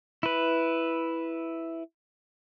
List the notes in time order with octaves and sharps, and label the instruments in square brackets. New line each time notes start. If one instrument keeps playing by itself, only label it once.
[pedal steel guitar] E4 B4